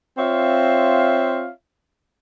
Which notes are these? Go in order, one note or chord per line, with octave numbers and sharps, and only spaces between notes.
C4 F4 C#5 E5 F5